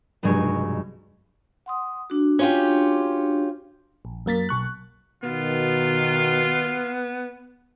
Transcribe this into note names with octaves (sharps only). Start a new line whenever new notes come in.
F1 B1 G2 G#3 G#4 C#6
F#5 C6 D#6
D4 F#4
C#4 F4 G4
A#1
F#2 A#3 A6 B6
B1 C#6 F#6
B2 D#3 B3 F4